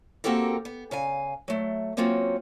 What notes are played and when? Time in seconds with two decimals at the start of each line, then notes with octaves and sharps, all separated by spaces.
0.24 A#3 C4 F#4 G4 A4 A#4
0.65 B3
0.91 C#3 F5 G#5
1.48 F#3 A3
1.97 F#3 A#3 C4 C#4 F4 F#4